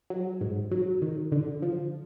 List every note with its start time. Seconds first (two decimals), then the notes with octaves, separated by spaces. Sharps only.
0.10 F#3
0.41 G#2
0.71 F#3
1.02 D#3
1.32 D3
1.62 F3